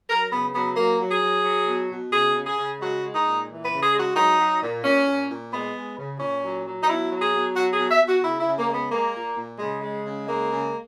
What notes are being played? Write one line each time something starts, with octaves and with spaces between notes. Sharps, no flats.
F#3 A#4
C#3 B3
F#3 B3
F#3 A#3
F#3
G#4
F#3
F#3
B2
B2
C#3 G#4
C#3
G#4
C#3
G#3 F#4
G#3
D#4
A#2
E3
B4
C#3
G#4
G#3
F#4
F#3 D#4
F#3
A#2
A#2 C#4
A#2
A#2
G#3 B3
G#3
C#3
A#2 C#4
F#3
F#3
D#4
B2 E4
F#3
G#4
B2
F#3 F#4
G#4
B2
E5
B2
F#4
C#3 E4
E4
C#3
A#3
G#3 B3
G#3 A#3
A#2
A#2
C#3 G#3
G#3
C#3
G#3 A#3
C#3